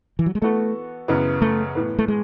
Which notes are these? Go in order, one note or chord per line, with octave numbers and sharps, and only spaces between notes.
E3
F#3
G#3
E3 A3 B3 F#4 A4
F#2 C#3 E3 B3
A3
A2 E3 B3
A3
G#3